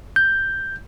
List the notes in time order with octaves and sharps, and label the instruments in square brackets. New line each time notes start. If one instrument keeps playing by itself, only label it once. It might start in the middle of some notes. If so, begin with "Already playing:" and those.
[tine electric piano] G6